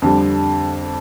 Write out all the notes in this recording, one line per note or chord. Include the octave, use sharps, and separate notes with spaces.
F2 D3 G3